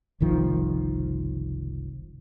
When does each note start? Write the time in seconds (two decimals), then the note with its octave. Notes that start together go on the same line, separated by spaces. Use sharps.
0.20 F#1 C2 D#3 F3